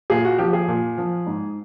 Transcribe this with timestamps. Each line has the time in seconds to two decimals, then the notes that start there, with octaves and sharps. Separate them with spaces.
0.10 A#2 G#4
0.25 F#4
0.38 F3 G4
0.53 G#4
0.68 A#2
0.98 F3
1.26 G#2